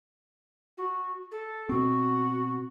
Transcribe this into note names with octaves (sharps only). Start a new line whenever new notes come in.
F#4
A4
B2 C4 F#4